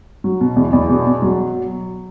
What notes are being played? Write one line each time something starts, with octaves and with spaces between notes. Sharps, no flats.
F#3
B2
E2
E2
B2
B2
F#3